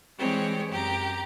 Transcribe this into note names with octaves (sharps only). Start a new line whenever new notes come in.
E3 G3 G#3 C4 C#5
F#2 G4 A#5